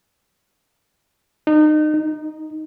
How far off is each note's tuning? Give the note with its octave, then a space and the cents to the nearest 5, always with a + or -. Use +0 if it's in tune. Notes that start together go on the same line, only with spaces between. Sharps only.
D#4 -30
D#4 +0